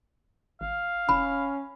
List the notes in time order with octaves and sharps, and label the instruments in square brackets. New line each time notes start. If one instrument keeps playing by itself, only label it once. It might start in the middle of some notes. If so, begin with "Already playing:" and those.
[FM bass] G#1 [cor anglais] F5
[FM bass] F1 [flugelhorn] C#4 [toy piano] B5